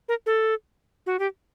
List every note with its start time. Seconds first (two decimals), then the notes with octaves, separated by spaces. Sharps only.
0.08 A#4
0.26 A4
1.06 F#4
1.19 G4